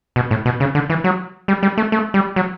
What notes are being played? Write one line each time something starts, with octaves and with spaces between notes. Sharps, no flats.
B2
A2
B2
C#3
D3
E3
F#3
G3
G3
A3
A3
G3
F#3